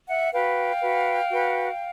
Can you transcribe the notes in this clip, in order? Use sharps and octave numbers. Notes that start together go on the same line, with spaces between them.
E5 F#5
F#4 B4 F5 G5
F#4 B4
F#4 B4